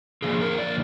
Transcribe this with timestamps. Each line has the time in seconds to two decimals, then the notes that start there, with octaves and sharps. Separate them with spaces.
0.22 D3 F3 A#3 G#4
0.41 A#4
0.58 D5